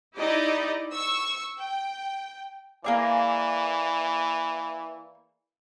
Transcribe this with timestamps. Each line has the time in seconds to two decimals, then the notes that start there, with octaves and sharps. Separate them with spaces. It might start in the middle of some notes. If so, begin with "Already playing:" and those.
0.17 D#4 E4 G4 D5 D#5
0.92 C#6 E6
1.58 G5
2.84 E3 A#3 G#4 D5